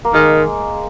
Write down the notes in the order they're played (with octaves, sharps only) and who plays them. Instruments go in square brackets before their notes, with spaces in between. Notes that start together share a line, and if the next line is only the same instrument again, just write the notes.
[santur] A#3
[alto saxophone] D#3 [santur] G#3